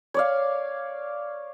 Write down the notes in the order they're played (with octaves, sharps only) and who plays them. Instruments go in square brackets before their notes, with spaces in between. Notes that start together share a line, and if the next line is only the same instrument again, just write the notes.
[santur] C#5 D5 F5